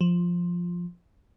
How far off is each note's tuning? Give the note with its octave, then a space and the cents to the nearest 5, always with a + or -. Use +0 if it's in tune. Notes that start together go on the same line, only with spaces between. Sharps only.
F3 +5